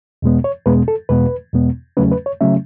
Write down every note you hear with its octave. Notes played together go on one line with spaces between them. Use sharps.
E2 B2 G#3 B3
C#5
E2 B2 G#3 B3 B4
A4
E2 B2 G#3 B3 B4
E2 B2 G#3 B3
E2 C#3 F#3 A3 C#4 B4
B4
C#5
C#3 F#3 A3 C#4 E5